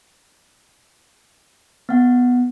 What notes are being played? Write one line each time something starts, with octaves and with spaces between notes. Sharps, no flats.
B3 F#5